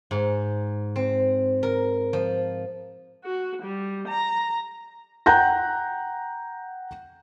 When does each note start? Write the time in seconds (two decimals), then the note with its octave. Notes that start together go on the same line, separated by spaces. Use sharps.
0.11 G#2
0.96 C4
1.63 A#4
2.13 F3
3.25 F#4
3.63 G3
4.08 A#5
5.26 F#5 G5 A#5 F#6 G6 A#6